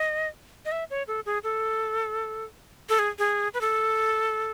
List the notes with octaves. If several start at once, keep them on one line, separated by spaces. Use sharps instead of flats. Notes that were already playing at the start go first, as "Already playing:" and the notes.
Already playing: D#5
D#5
E5
C#5
A4
G#4
A4
A4
G#4
G#4
B4
A4